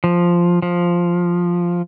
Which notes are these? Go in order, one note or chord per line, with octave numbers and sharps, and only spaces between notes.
F3
F3